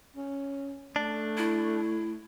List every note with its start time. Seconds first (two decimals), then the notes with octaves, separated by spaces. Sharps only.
0.16 C#4
0.96 A3 D4
1.37 E4